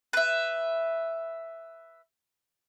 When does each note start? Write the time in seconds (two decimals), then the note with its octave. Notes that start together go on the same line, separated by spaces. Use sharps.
0.13 B4 E5